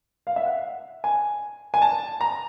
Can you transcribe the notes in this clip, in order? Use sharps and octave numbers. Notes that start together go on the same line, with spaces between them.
F5
E5
F#5
G#5
G#5
A5
A#5